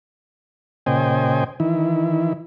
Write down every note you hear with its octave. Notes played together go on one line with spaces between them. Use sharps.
A#2 C#3 C5 D#5 G5 G#5
D#3 E3 E4